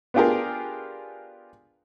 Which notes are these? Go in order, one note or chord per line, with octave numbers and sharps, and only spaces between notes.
B3 D4 F4 G4 G#4 A#4